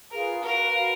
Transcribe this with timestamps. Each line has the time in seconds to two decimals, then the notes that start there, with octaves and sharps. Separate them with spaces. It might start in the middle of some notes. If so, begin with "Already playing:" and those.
0.11 F4 G#4 A#4 B4 F5
0.42 F#4 A#4 B4 F5
0.74 F#4 B4 F5